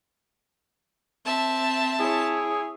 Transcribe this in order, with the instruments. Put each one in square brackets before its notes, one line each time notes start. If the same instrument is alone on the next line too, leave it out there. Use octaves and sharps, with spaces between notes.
[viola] C4 E5 [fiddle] A5
[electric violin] E4 C#5 [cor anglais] G#4